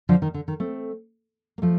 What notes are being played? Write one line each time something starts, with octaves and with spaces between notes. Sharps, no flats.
D3 F3
D#3
D3
D#3
A3 C4
A#3
F3 A3